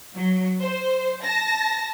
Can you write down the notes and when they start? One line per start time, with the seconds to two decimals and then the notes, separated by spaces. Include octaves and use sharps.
0.14 F#3
0.61 C5
1.21 A5 A#6